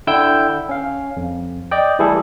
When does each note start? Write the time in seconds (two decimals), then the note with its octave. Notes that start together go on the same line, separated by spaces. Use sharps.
0.07 D3 E4 G5 E6 G6
0.69 C#4 F5
1.17 F2
1.71 D5 D#5 G5
1.99 E3 G3 A3 E4 G#4 A4